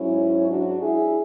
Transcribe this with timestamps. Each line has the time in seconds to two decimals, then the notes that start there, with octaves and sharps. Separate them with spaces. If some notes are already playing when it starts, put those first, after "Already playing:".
Already playing: G#2 F#3 C#4 E4
0.47 D4 F#4
0.80 E4 G#4